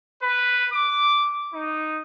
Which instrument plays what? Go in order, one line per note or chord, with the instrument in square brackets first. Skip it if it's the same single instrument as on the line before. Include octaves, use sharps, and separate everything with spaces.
[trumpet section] B4
D6
D#4